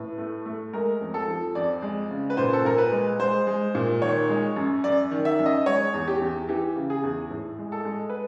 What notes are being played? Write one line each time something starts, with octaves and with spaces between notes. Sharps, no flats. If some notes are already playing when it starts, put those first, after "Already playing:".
Already playing: A2 B4
A3
A3
G#3 A#4
F2
A4
F3
F2 D5
G#3
C#3
B4
A#2 C5
A4
A#2 A#4
B4
G#3
G#3 C5
G#3
A#2
D#3 C#5
G#3
F#2
F#2 D5
D#3
E5
F#2
D#5
G#3 C#5
E2
G4
E2
E3 G4
C#3
G#4
E2
A2
G#3
A4
G#3
B4